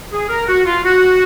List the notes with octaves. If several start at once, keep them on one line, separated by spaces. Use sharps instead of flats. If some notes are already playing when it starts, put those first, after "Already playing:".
G#4
A#4
F#4
F4
F#4